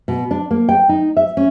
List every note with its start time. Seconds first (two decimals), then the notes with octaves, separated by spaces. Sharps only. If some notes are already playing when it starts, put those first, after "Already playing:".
0.08 B2
0.31 D4
0.51 A#3
0.69 G5
0.89 D#4
1.17 E5
1.37 C#4